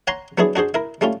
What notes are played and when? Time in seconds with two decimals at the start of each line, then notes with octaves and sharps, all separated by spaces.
0.07 C#5 F#5 G#5 A#5 C6
0.38 F#3 B3 D4 E4 G#4
0.56 D4 F#4 G#4 C5
0.74 E4 A#4
1.01 G3 A3 C#4 F4